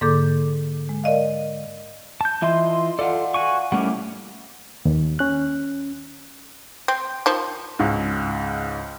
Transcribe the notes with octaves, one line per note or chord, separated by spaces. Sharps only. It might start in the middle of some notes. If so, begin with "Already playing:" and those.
G#2 D3 A#3 A4 D6 G6
G#3
A#4 D5 D#5 F5
A5 G6
E3 F4 D#5 E5 C6
F4 A4 D5 F5 F#5
F#4 G#5 C#6
A2 G3 A3 A#3 C#4 F#5
D#2
C#4 F#6
C4
D#3 F3
C#2 G#2